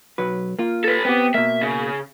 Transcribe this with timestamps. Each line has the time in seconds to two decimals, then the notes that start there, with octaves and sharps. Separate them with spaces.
0.18 B1 F#3 B4
0.59 A#3 F4
0.84 A4 B4
1.05 B3 C4 G4
1.34 B2 A#3 E5
1.61 C#3